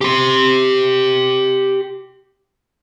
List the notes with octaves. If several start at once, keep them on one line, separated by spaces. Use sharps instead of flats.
G4 C6